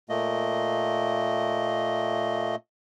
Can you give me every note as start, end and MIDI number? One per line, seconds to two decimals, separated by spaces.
0.09 2.56 46
0.09 2.56 57
0.09 2.56 58
0.09 2.56 75